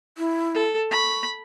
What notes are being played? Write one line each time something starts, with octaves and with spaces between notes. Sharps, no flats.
E4
A4
B5 C#6